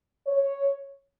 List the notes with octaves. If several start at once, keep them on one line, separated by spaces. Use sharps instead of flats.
C#5